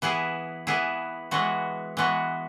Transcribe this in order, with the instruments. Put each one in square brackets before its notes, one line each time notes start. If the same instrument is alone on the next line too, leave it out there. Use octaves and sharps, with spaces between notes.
[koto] E3 B3 E4 G#4
E3 B3 E4 G#4
E3 G#3 B3 F#4
E3 G#3 B3 F#4